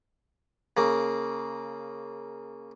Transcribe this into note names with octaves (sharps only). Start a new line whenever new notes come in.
C#3 A#3